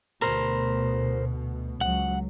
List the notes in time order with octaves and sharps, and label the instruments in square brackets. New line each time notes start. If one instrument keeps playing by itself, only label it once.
[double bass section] D2 B2 [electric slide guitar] A#4 C5
[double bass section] C#2 F#3 [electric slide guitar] F#5